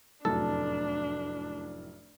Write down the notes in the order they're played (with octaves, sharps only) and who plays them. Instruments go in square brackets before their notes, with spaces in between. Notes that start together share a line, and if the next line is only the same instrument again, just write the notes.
[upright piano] F1 F#2 A2 [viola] D4 [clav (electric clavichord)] A4